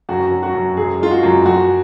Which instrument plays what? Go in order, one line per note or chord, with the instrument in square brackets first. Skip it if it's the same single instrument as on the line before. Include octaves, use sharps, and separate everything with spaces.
[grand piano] F#2 F#4
F#3
F#4
F#2
F#2 G#4
G#3 F4
F#4
F#2
F#2 F#4